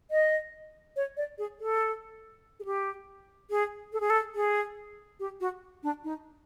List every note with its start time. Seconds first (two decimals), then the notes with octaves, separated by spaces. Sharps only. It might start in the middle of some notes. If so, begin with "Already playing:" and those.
0.11 D#5
0.96 C#5
1.17 D5
1.38 G#4
1.60 A4
2.60 G#4
2.65 G4
3.50 G#4
3.93 A4
4.00 G#4
4.10 A4
4.35 G#4
5.20 G4
5.41 F#4
5.83 D4
6.04 D#4